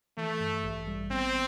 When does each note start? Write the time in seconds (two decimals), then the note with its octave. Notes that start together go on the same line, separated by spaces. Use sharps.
0.17 E3 A3
0.40 G2
0.64 A1
0.87 G3
1.11 B3 C4